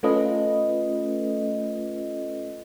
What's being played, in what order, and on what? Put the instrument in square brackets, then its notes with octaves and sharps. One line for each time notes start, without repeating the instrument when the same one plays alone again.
[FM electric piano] A3 C#4 F4 A4 B4 D#5